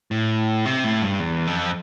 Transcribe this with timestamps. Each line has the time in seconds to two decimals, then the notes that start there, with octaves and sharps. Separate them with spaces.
0.11 A2
0.66 C3
0.84 A2
1.02 G2
1.20 E2
1.47 F2